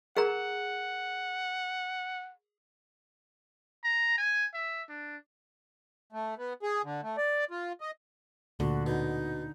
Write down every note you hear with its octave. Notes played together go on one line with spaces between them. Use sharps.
G#4 A#4 F#5 A#5
A#5
G#5
E5
D4
A3
B3
G#4
D3
A3
D5
F4
D#5
D2 A#2 D3 F#4
B2 D#4